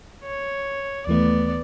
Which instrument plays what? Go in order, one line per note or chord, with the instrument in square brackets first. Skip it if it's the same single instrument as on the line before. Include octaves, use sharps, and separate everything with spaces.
[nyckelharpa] C#5
[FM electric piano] D#2 E3 A3 [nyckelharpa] B3 D5